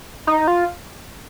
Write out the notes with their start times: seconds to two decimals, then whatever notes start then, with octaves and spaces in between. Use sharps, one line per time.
0.27 D#4
0.48 F4